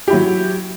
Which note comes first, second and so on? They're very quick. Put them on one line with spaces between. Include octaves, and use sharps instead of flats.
G4 E4 F#3